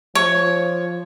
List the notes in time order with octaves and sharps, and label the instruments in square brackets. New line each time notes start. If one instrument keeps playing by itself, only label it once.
[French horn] F3 [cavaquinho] C#5